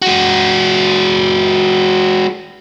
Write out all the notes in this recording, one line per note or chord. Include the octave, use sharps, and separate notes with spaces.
G#3 F#4